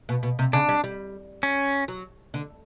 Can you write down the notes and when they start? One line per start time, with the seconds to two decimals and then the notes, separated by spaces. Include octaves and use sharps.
0.09 B2
0.23 B2
0.39 C3
0.53 C#3 D4
0.69 G3
0.84 G3
1.43 C#4
1.88 F#3
2.34 D3